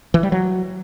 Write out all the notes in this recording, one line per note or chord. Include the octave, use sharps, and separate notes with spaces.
E3
G3
F#3